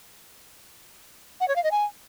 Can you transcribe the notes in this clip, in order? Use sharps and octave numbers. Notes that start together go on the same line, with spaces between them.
F#5
C#5
F5
D#5
G#5